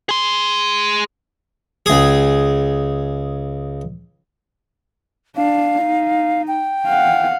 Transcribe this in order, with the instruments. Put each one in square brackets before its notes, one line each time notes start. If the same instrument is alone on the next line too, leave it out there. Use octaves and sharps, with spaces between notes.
[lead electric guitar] G#4 C6
[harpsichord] C#2 G#4
[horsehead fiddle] D4 [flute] F5
[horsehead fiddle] D#4
[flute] G5
[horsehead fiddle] F5 F#5